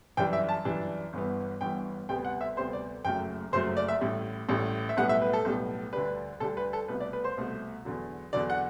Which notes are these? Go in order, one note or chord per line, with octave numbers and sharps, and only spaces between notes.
F#2 E3 G3 D4 G5
E5
A5
F#2 E3 G3 D4
G1 G2 E3 B3
G1 G2 E3 B3 G5
D2 C3 G3 B3 G5
F#5
E5
D2 C3 G3 B3 C5
D5
F#1 F#2 F#3 A3 G5
F#1 F#2 F#3 A3 C5
D5
E5
A1 A2 G3
A1 A2 G3
E5
B1 A2 G3 B3 F#5
E5
B4
A4
B1 A2 G3 B3
D2 D3 G3 D4 B4
D2 D3 G3 D4 A4
B4
A4
C2 B2 A3 B4
D5
B4
C5
C2 B2 A3
E2 D3 F#3
E2 D3 F#3 D5
F#5